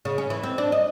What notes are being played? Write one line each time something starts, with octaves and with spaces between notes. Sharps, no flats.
C#3
C#4
E3
C4
D4
D#5